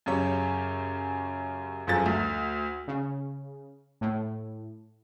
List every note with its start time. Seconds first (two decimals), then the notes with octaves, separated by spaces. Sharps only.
0.06 F#2 C#3 G4 C#5
1.87 G1 F#2 F3 G#4 A4 A6
2.06 D2
2.88 C#3
4.01 A2